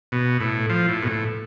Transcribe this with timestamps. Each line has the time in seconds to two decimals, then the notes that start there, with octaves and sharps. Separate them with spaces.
0.12 B2
0.40 A2
0.70 F3
0.88 A2
1.03 B2
1.07 A2